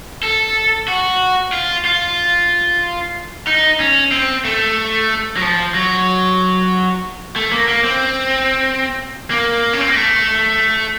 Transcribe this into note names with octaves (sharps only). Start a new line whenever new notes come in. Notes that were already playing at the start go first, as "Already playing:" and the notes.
A4
F#4
F4
F4
D#4
C#4
C4
A3
F#3
F3
F#3
A3
A#3
A#3
C4
A#3
C#4
C4
A#3
A3